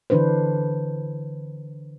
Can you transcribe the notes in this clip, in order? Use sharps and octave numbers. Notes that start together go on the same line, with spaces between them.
D3 E3 D4 B4 C5